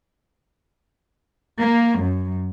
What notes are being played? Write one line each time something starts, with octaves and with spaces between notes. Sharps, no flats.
A#3
F#2